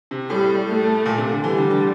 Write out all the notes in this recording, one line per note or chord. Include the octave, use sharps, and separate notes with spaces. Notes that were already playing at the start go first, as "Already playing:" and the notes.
C3
A2 G3
A3
A#2
C3
D3
E3 G3
D3
D3